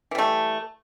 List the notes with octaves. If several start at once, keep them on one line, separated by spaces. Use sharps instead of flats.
E3 G3 A3